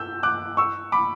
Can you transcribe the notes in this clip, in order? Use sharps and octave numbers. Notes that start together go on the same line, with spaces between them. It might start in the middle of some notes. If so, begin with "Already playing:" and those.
Already playing: E6 G6
D6 F#6
C#6 E6
B5 D6